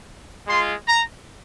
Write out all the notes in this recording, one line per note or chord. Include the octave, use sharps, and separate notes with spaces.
G#3 F4 C6
A#5